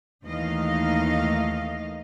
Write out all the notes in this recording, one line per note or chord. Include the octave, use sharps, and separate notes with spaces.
D#2 E3 A3 D#4 D#5 F5